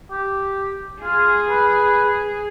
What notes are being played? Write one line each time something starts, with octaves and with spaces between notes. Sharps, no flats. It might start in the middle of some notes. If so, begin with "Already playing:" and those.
G4
F4 G#4
B4